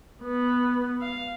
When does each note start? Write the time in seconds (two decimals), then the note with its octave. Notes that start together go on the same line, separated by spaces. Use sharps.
0.23 B3
1.01 F5